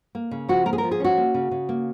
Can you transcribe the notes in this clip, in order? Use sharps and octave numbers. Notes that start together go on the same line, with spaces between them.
A#3
C#3
F3 F#4
A#3 A#4
G#4
A#4
F3
G#4
C#4 F#4
A#3
C#3
C#3
A#3